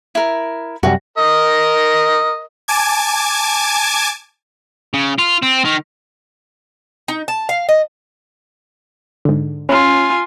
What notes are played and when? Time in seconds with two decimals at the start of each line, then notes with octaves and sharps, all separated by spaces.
0.15 E4 A#4
0.83 F#2 C3 G3 F#4
1.18 A#4 D#5
2.68 G#5 A5 D6 G#6
4.94 C#3
5.19 F4
5.42 C4
5.65 D#3
7.08 D#4
7.28 A5
7.49 F5
7.69 D#5
9.25 G#2 D3
9.69 C#4 F4 G#5